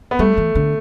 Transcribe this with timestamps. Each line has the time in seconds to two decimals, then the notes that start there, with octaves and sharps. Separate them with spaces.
0.11 B3
0.19 G3 A3
0.37 E3
0.55 D3